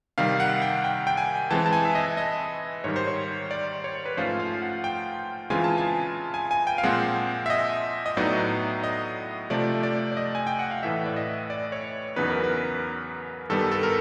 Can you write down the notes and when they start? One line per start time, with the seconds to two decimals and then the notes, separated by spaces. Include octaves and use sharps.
0.18 C3 D#3 G3 F5
0.40 F#5
0.62 G5
0.84 G5
1.07 G5
1.17 G#5
1.51 E3 G#3 C4 A5
1.66 A5
1.73 G#5
1.85 E5
1.95 D#5
2.17 D#5
2.84 G#2 D#3 G3 C#5
2.96 C5
3.07 C#5
3.51 D5
3.84 C#5
4.06 B4
4.17 G#2 F3 A3 C#4 F4 C5
4.39 F5
4.62 F#5
4.84 G5
5.50 C#3 E3 G#3 C4 F4 G#5
5.64 A5
5.78 G#5
6.34 G#5
6.51 G#5
6.67 G5
6.78 F5
6.83 A#2 F3 G#3 C4 F#5
7.46 E5
7.50 D#5
8.06 D#5
8.17 A2 F#3 B3 D#4 D5
8.84 D#5
9.50 C3 F3 A3 D5
9.83 D5
10.12 D5
10.17 D#5
10.35 G#5
10.47 G5
10.59 F#5
10.71 F5
10.83 A2 E3 A3 E5
11.06 D5
11.16 D#5
11.50 D5
11.72 C#5
12.16 E2 C#3 F#3 B3 D#4 B4
12.30 A#4
12.43 B4
13.50 G2 D#3 G3 B3 A4
13.72 A4
13.83 A#4